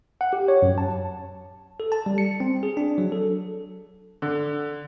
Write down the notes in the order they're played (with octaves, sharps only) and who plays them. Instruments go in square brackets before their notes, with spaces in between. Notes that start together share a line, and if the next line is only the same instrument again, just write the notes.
[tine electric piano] F#5
G4
C#5
F#2
A5
A4
A5
G3
C#7
C4
G#4
D4
F#3
A4
[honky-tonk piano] D3